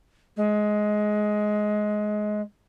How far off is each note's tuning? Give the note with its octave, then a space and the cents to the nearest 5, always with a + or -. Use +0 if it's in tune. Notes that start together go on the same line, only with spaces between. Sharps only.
G#3 +15